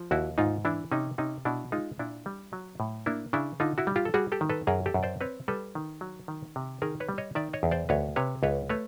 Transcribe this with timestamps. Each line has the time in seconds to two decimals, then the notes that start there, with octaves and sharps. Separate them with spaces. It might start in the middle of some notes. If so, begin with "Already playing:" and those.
Already playing: F3
0.11 D#2 E4 F#4
0.38 G#2 D#4 F4
0.65 E3 D4 E4
0.92 C3 C#4 D#4
1.18 C3 C#4 D#4
1.45 B2 D4 E4
1.72 G#3 D#4 F4
1.99 A#2 D4 E4
2.26 G3
2.53 F#3
2.80 A2
3.06 A#3 D4 E4
3.33 C#3 D4 E4
3.60 D3 D#4 F4
3.78 E4 F#4
3.87 G3
3.96 F4 G4
4.05 A4
4.14 G3 F#4 G#4
4.32 G4 A4
4.41 D#3
4.50 A4 B4
4.67 F#2 G#4 A#4
4.86 G4 A4
4.94 F#2
5.03 C5 D5
5.21 C4 B4 C#5
5.48 G3 A4 B4
5.75 D#3
6.01 F#3
6.28 D#3
6.56 C3
6.82 D#3 G#4 A#4
7.00 B4 C#5
7.09 G3
7.18 C#5 D#5
7.35 D#3 D5 E5
7.53 C#5 D#5
7.63 E2
7.71 C5 D5
7.89 D2 B4 C#5
8.16 C3 B4 C#5
8.43 C#2 B4 C#5
8.69 A3 B4 C#5